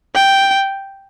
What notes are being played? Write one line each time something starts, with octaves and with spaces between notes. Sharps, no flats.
G5